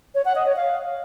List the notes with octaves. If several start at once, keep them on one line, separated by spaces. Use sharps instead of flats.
C#5
F#5
D#5
C#5
F5